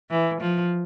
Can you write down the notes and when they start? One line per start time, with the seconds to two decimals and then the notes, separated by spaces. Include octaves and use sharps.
0.10 E3
0.41 F3